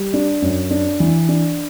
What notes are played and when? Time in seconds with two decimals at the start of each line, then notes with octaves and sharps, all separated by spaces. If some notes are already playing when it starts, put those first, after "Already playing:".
Already playing: G3
0.14 D4
0.42 F#2
0.71 D4
1.00 E3
1.28 D4